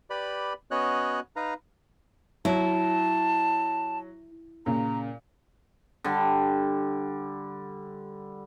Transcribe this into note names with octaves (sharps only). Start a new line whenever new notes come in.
G4 B4 D5 B5
B3 C#4 F#4 C#5 D#5 F#6
D#4 B4 F5 A#5
F#3 E4 A5
A#2 C#3 A#5
D3 G3